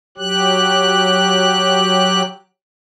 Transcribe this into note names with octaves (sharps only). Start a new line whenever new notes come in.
F#3 G4 F#6